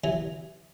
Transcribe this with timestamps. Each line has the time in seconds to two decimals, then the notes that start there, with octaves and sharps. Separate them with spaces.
0.04 E3 F#3